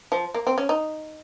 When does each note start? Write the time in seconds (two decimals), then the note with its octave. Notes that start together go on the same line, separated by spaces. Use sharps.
0.12 F3
0.34 A#3
0.47 C4
0.58 C#4
0.69 D#4